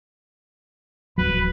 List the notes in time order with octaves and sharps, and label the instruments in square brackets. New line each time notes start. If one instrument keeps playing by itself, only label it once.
[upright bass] D1 C#3 [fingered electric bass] F#3 [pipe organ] B4